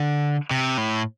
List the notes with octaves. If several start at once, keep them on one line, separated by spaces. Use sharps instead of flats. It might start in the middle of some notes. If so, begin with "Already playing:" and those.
Already playing: D3
C3
A2